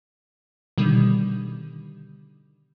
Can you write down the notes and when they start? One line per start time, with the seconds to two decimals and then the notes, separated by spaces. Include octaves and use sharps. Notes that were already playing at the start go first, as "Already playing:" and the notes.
0.78 B2 D3 D#3 G3